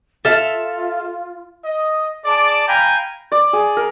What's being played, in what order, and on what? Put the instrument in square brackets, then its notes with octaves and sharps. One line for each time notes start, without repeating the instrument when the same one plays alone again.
[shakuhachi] F4 [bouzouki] A4 E5 F5
[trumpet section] D#5
G#4 D5 A5 D6
F5 G5 G#5 A#5 B5
[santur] D5
G#4
A#4